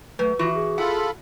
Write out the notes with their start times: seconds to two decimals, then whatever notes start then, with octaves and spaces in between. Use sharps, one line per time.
0.19 F#3 A3 B4
0.39 E3 F4 F#4
0.55 G#4
0.78 F4 A4 F#5 B5